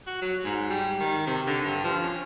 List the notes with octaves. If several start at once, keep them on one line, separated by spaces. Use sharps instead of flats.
F#4
F#3
G#2
G3
D#3
C3
D3
G2
F3
C#4